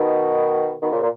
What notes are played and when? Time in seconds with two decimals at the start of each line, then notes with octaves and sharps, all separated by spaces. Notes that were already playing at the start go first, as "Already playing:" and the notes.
Already playing: B2 D#3
0.80 B2 D#3
0.91 A#2 C#3
1.01 A#2